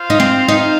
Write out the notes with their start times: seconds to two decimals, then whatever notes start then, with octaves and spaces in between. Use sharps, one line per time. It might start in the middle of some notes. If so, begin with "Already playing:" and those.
Already playing: F4 C5 F5
0.10 D#4
0.20 C4
0.48 D#4